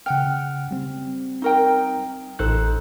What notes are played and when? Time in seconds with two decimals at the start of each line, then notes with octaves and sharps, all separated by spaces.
0.06 C#3 F#5 G5 F6
0.71 G3 C4
1.42 D#4 A#4 G5
2.39 A1 D#4 A4 C5 F#6